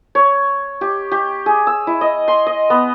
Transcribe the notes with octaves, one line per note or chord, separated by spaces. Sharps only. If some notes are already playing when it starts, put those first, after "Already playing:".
C#5
G4
G4
G#4
E6
E4
D#5
C6
D#5
B3